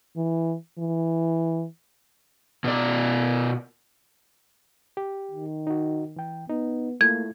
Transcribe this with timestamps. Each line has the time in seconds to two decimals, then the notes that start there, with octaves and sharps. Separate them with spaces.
0.16 E3
0.78 E3
2.64 B2 D5
4.97 G4
5.31 D#3
5.67 D#4 F#4
6.16 E3 G5
6.49 B3 D#4
7.01 A3 A#3 E4 F4 G#6